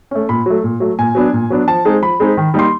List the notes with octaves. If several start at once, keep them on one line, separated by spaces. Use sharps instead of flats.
A3 C#4
A#2 B5
F#3 A3
A#2
F#3 A3
A#2 G#5
F#3 B3 D4
A#2
F#3 B3 D4
F3 A5
G#3 C4 D#4
F3 B5
G#3 C4 D#4
D#3
G3 A#3 D#4 C6